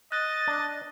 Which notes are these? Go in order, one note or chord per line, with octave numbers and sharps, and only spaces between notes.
D#5 F#6 A6
D4